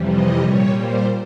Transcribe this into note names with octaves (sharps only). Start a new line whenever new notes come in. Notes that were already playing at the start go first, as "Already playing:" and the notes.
Already playing: F2 C3 E3 G3
D#5
A#2 G3 C#5
C5